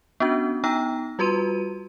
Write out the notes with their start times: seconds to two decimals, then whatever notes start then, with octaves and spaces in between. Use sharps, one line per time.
0.20 B3 C#4 D4 F#4 G6
0.64 B3 D#4 G5 A#5 E6 A#6
1.19 G3 F4 F#4 B4 C6 D#7